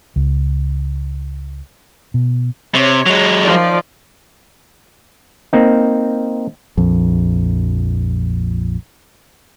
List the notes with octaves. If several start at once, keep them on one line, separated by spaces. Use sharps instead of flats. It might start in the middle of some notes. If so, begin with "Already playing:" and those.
C#2
B2
C3 C#5
F#3 G#3
D#3 F3 D5
A#3 C4 D#4
A#1 F2